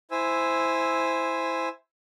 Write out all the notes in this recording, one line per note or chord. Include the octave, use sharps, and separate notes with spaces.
E4 C5 G#5 E6